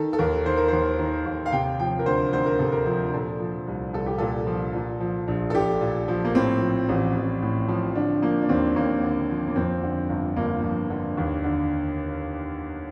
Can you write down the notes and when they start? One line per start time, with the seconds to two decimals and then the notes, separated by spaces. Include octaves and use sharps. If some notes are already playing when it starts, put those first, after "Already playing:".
Already playing: D#3 A4
0.13 A4
0.19 D#2 A#4
0.46 D#3 C5
0.57 A#4
0.68 D#2 C5
0.99 D#3
1.26 D#2
1.46 F5
1.52 C3 G5
1.80 F3 G5
1.99 A#4
2.06 D2 C5
2.33 D2 C5
2.46 A#4
2.59 C3 A4
2.72 A#4
2.86 F3
3.13 A#2 A4
3.40 F3
3.67 C2
3.93 C2 A4
4.06 G4
4.18 A#2 A4
4.47 F3
4.74 A#2
5.00 F3
5.28 A#1
5.50 A4
5.55 A#1 G4
5.81 A#2
6.08 F3
6.25 A#3
6.35 A2 C4
6.61 F3
6.89 A1
7.15 A1
7.43 A2
7.68 F3
7.95 D3 D4
8.22 F3 A#3
8.42 D4
8.49 D#2 C4
8.76 D#2 A#3
9.03 D3
9.30 F3
9.48 A#3
9.56 F2 C4
9.83 D3
10.09 G1
10.36 G1 A#3
10.63 F2
10.90 D3
11.17 D#2
11.44 D3